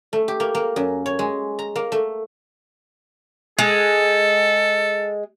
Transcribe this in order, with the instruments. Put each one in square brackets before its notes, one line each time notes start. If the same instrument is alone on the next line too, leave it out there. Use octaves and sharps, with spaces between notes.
[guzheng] A3
G4
A#3
A#3
F#2
C#5
G#3
A#5
A#3
A3
[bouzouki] G#3 [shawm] A4